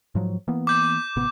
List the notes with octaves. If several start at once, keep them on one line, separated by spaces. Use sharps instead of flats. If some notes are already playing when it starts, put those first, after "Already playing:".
G#2 F3 F#3
E3 A#3 B3
D6 G6
A1 C3 B3